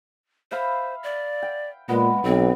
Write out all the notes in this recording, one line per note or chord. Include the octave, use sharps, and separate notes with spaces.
C5 E5 F5 B5
D5
G5
A#2 G#3 B3
B1 C4